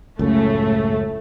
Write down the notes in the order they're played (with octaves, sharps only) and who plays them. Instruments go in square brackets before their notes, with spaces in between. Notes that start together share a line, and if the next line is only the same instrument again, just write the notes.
[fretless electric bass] C#2 F#2 C#3 [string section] A2 A3